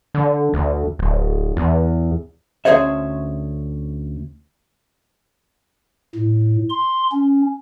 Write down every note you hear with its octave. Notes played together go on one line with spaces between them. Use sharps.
D3
D2
D1
E2
D2 C#4 G#4 C5 C#5 E5
A2
C6
C#4